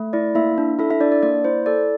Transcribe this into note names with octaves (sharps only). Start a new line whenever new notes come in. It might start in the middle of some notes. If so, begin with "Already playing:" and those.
Already playing: A3
E4 D5
A#3 E4 E5
D4
E4 A4 E5
E4 E5
D4 D5
D5
A#3 D5
E4 C5
A4 D5